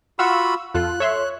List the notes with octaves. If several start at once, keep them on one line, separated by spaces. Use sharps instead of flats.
F4 F#4 F5 F#5 B5 C#6 E6
F2 F4 A4 F#6
A4 C#5 E5 C6